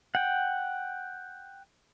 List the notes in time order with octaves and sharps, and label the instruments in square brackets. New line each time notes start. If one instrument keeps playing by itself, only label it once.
[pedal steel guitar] F#5 G5